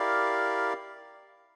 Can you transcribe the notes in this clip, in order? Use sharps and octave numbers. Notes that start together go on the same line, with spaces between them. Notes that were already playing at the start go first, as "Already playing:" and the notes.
Already playing: E4 G4 A#4 D5 F5